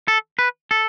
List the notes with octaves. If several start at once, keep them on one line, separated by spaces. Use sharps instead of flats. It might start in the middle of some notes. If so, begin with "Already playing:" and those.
A4
B4
A4